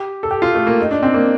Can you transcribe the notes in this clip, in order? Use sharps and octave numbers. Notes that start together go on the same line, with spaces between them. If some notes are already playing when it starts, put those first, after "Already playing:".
Already playing: G4
A4
G4
F4
A3
A#3
D#4
D4
C4
A#3